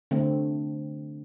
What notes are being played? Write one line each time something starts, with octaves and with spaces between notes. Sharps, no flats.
D3 A3 C4